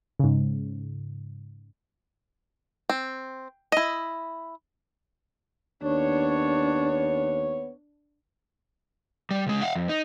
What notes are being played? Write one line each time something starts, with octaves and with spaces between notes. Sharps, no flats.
G#2 C#3
C4
E4 D#5
D#2 B3 D4 C#5
G3
C#2 G#3
F5 F#5
F2
D#4